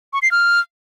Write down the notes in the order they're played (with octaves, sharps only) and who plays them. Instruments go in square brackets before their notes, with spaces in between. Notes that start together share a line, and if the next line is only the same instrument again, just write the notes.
[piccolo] C#6
C7
F6